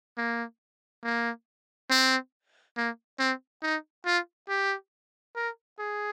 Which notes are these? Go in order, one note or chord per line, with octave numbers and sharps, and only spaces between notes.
A#3
A#3
C4
A#3
C4
D#4
F4
G4
A#4
G#4